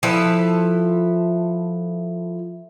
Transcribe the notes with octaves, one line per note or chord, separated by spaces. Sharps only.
F3 E4 A4 B4